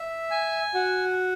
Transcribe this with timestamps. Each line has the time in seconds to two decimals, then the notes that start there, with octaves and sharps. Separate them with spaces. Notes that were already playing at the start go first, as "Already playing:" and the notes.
Already playing: E5
0.31 G#5
0.74 F#4